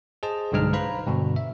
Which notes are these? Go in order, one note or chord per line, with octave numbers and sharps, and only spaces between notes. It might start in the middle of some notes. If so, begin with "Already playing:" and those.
G#4 C5 D#5 A5
B1 G2 D3 G#3 D#4 F6
B4 C5 F5 A#5 B5
G2 B2 D3
E5